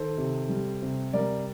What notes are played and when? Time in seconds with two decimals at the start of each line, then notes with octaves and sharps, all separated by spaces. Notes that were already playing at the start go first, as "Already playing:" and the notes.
Already playing: D#3 A4 C5
0.18 C3
0.49 G3
0.82 C3
1.13 G3 A#4 D5